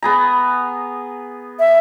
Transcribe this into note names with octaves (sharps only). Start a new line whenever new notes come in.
B3 G#4 A#5
E5